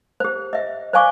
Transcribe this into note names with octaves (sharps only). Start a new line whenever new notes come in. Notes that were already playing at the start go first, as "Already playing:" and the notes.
G4 C5
D#5 E5
C5 D5 F5 G#5 C#6 D6